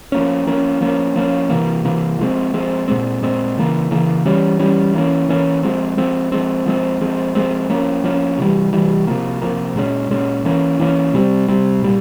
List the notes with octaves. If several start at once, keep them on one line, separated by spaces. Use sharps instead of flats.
F3 A#3 C#4
F3 A#3 C#4
F3 A#3 C#4
F3 A#3 C#4
C3 E3 A#3
C3 E3 A#3
F3 G#3 C4
F3 G#3 C4
A#2 G#3 C4
A#2 G#3 C4
C#3 E3 A#3
C#3 E3 A#3
E3 G3 C#4
E3 G3 C#4
E3 A#3 C#4
E3 A#3 C#4
F3 G#3 C4
F3 G#3 C4
F3 G#3 C4
F3 G#3 C4
F3 G#3 C4
F3 G#3 C4
F3 A#3 C#4
F3 A#3 C#4
C3 E3 G3
C3 E3 G3
C3 F3 A#3
C3 F3 A#3
A#2 G#3 C#4
A#2 G#3 C#4
E3 A#3 C#4
E3 A#3 C#4
C3 G3 C4
C3 G3 C4
A#2 G3